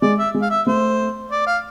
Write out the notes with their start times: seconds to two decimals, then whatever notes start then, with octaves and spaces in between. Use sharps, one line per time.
0.02 G#3 D5
0.18 E5
0.34 G#3
0.42 F5
0.50 E5
0.66 A3 C5
1.31 D5
1.47 F5